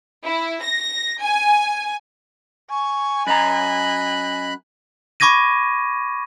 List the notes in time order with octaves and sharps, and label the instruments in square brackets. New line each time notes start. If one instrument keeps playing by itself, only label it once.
[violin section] E4
A#6
G#5
[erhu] G#5 [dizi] C#6
[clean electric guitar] F#2 A#5 [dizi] D#5 [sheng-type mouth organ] B5 F#6
[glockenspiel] B5 C#6 D6 G#6 A#6 D#7